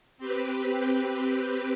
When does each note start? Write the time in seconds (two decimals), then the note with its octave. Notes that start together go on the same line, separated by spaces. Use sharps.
0.18 C4 G4 B4